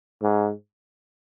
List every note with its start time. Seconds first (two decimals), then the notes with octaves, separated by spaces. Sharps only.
0.22 G#2